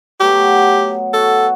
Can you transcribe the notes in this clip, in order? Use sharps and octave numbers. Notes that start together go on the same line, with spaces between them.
F#3 A3 B3 G4
F#4 A4